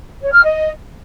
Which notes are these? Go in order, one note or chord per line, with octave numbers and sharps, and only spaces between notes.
C#5
F6
D#5